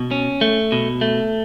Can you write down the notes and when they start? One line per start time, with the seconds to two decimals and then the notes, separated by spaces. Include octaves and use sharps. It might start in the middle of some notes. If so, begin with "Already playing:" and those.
Already playing: B2
0.11 C#4
0.41 A3
0.72 B2
1.01 A3